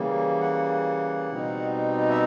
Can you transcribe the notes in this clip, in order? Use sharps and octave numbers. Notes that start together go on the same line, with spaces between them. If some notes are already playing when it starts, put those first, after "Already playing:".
Already playing: C#3 E3 G3 A#3
F#5
B2 G3 C4 D#4
E5